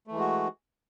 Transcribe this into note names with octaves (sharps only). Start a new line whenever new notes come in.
E3 G#3 A3 F#4